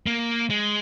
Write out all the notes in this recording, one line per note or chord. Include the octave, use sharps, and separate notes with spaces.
A#3
G#3